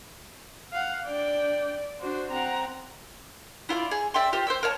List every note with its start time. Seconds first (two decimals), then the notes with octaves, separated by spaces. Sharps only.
0.72 F5 F#5
1.06 D4 D5 G5
2.01 D4 F#4 C5
2.31 C4 F#5 A#5
3.69 E4 F4 C5 D5
3.91 G#4
4.14 D5 E5 G5 C6
4.33 F4 G4 C5
4.47 C5 G5 E6
4.63 A#4 C#5 F5 A5